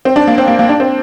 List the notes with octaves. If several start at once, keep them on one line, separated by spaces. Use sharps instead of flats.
C4
D4
A#3
C4
A#3
A#3
D4
C4